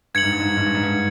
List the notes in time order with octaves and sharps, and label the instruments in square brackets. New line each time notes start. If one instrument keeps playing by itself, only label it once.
[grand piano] G2 [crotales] G#6 C#7 F#7
[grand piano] G#2
G2
G#2
G2
G#2
G2
G#2
G2